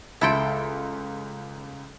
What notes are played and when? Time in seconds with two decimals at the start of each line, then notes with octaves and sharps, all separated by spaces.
0.21 C#2 E4 A4 G5 C6